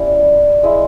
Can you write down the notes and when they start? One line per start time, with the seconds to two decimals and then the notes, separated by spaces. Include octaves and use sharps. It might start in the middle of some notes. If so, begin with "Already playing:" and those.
Already playing: G3 C#4 E4
0.63 G#3 E4